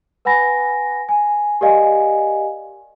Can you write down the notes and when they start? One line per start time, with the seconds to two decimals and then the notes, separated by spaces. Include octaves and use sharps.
0.25 B4 F#5 G#5 B5 A#6
1.09 G#5
1.61 G4 A#4 D5 D#5 F5 G#5